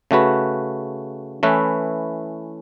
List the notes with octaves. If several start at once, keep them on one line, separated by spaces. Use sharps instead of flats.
C#3 A3 F#4 B4
E3 A3 C#4 E4 B4